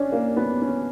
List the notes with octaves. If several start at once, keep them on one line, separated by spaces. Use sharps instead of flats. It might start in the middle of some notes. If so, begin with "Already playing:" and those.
Already playing: C#4 D4
A#3
B3
C#4